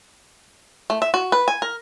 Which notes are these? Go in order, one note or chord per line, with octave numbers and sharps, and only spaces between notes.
A3
E5
F#4
B4
G#5
A#4